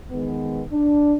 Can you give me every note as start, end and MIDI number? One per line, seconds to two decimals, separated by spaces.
0.11 0.63 51
0.11 0.63 56
0.11 0.63 59
0.73 1.16 62